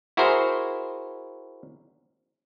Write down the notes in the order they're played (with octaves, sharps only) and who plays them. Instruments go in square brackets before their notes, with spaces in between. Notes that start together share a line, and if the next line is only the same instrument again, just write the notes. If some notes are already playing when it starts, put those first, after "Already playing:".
[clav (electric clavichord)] E4 F#4 G#4 A#4 C5